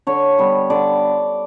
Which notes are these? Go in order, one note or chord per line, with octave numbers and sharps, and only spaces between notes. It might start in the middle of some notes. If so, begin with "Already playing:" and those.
D3 C#5
G3 B3
D3 D5